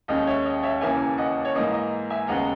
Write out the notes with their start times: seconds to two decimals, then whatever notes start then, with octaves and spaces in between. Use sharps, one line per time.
0.08 D#2 D#3 G#3 C#4 D#5
0.27 C#5 E5
0.45 D#5
0.63 C#5 E5
0.81 E1 D#2 C#3 E3 A#3 E5 G#5
1.18 D#5 F#5
1.45 C#5
1.55 G#2 E3 A#3 D#5
1.73 D#5
2.10 E5 G#5
2.28 D#2 C#3 G#3 B3 F#5 A#5